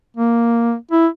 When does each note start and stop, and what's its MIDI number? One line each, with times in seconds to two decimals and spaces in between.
0.17 0.74 58
0.91 1.07 64